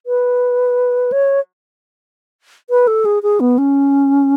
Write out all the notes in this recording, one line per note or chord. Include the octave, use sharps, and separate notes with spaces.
B4
C#5
B4
A4
G#4
G#4
B3
C#4